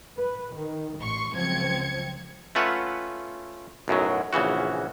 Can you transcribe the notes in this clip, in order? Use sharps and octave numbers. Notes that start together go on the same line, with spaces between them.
B4
D#3
A1 C6 C#6
C#2 F3 F#3 C4 G#6 C#7
A3 C#4 F4 B4 E5 F#5
B1 F#2 A2 F#3
A#1 C#3 E3 F#4